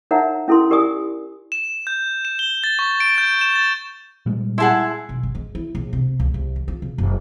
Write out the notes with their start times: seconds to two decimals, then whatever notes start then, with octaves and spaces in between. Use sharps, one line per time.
0.11 D#4 A#4 C#5 E5 F#5 A#5
0.48 C#4 E4 A4 A#4 C6
0.71 G4 A#4 D5 G#5 D#6
1.52 E7
1.87 G6
2.25 E7
2.39 G7
2.64 A6
2.79 C#6
3.00 D7
3.18 G6
3.41 E7
3.56 A6
4.26 A#2 G3 G#3
4.58 E4 G#4 F#5 A5 C6
5.09 B1
5.23 G1
5.35 G#3
5.55 E4
5.75 A#1
5.93 C3
6.20 C#2
6.34 C2
6.56 D3
6.68 F4
6.82 C#3
6.98 F#1